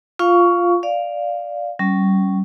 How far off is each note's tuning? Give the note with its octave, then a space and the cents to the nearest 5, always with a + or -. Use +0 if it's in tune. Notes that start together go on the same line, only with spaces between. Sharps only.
F4 +0 F5 +0 C#6 +15
D5 +0 F5 +0
G3 -30 C#4 +0